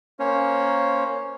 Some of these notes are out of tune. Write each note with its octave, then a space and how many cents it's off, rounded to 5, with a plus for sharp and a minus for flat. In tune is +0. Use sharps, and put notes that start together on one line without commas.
A#3 +0 C#4 +0 C5 +0